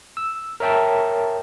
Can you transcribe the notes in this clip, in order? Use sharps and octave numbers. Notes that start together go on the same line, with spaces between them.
E6
A#4 C#5 E5 G5 A5